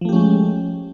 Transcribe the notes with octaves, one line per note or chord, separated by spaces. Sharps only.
F3 G#3 A3 C#4 G4